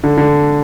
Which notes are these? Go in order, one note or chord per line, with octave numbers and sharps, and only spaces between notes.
D3
D3